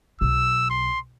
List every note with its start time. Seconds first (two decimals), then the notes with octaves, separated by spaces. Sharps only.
0.21 B1 E6
0.70 C6